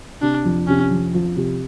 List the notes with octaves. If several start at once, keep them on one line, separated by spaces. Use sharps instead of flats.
C3 D4
F2
C3 C#4
F2
F3
C3